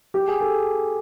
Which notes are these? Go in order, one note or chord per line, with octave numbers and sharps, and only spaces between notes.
G4
G#4
A4